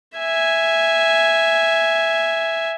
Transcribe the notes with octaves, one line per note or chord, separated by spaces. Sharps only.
E5 G#5